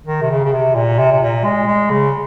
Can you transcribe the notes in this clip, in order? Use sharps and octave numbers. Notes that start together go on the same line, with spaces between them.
D#3
C3
C#3
C#3
C3
A#2
C3
C3
A#2
G#3
G#3
C#3